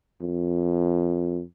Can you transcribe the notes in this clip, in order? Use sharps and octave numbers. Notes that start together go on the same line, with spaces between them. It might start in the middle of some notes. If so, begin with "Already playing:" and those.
F2